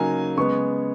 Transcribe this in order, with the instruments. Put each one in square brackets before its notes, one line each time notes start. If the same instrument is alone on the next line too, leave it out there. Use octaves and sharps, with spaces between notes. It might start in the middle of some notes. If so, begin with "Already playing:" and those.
Already playing: [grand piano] C#3 F#3 A#3 D#4 G#5 A#5
C#3 G#3 B3 C#6